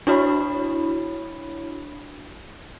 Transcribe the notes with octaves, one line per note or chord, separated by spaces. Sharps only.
D4 E4 F#4 C#5 B5